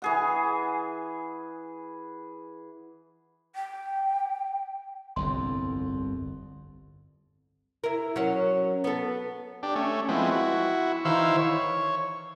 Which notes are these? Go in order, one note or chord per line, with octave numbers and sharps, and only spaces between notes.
E3 G#4 F#5
G5
G1 C2 F2 C6
E4 A#4
F#3 C#4
B3 A4
D4 G4
A3 C#4
F3 G#3 B3 C4 E4
E4 F#4
D#3 E3 E4 C5 F5 E6
C#5